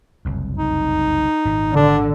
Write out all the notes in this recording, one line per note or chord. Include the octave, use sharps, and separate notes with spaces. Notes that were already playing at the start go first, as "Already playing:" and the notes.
F#1 C2 F2
D#4
G#1 A#2
D3 D4